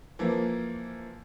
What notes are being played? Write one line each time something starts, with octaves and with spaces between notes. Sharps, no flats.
E3 F3 A#3